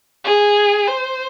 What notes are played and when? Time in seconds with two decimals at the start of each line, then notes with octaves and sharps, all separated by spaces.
0.24 G#4
0.87 C5